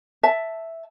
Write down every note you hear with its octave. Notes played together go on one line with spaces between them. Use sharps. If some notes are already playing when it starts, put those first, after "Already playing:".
E5 A5